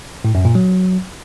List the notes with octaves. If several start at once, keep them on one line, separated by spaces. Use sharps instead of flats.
A2
F#2
A#2
F#3